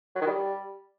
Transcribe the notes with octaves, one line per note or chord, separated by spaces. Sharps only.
F#3
D#3
G3